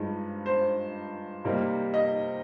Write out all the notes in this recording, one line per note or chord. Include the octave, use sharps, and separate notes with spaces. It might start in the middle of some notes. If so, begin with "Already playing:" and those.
Already playing: G2 F3 G#3 D#4
C5
C3 G3 A#3 D#4
D#5